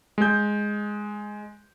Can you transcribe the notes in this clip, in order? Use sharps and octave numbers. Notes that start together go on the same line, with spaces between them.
G#3 G6